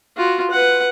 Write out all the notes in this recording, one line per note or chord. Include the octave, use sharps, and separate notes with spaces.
F4 F#4
B4 F#5